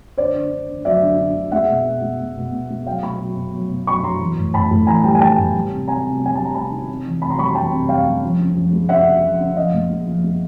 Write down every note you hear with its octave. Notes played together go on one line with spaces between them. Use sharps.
D3 C5 D5
D3
D3
D3
F#3 D5 E5
D3
D3
D3
G#3 E5 F#5
B2
B2
G#3
B2
B2
B2
G#3
F#3 F5 G5
B2 B5 C#6
F#3
B2
F#3
B2
F#3 B5 C#6
F#3 A#5 C6
E3
A2
A2 A5 B5
A2
E3 G#5 A#5
G3 G5 A5
G#5
G3 G5 A5
A2
G3
C3
C3 G#5 A#5
C3
G3 G#5
G3 A5
A#5
C3 A5 B5
D#3
C3
E3
C3 A5 B5
A#5 C6
G3 B5 C#6
A#5 C6
E3 G5 A5
C3
G3 F5 G5
G3
F3
C#3
F3
G#3
C#3 E5 F#5
C#3
F3
C#3
F3 D#5 F5
A#2
G#3
F3
G#3